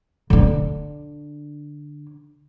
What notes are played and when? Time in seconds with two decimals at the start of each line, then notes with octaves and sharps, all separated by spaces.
0.30 D3 D4